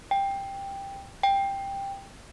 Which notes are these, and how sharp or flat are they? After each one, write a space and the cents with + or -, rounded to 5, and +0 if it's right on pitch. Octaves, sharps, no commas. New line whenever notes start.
G5 +10
G5 +10